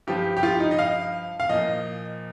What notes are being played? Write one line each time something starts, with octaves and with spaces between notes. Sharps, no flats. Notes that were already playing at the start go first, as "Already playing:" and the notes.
G2 F3 G4
G4
F4
D#4
D#5
F5
F5
A#2 F3 D#5